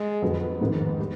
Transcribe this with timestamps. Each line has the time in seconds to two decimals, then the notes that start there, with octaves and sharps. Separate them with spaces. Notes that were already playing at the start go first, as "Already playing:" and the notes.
Already playing: G#3
0.22 F2 D3 F#3 B3
0.61 G#2 D#3 G#3 B3
0.99 G3